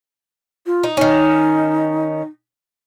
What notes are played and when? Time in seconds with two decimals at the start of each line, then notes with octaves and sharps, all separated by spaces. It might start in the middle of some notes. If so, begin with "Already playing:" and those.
0.66 F4
0.83 D#4
0.97 D#3 C#4 D#4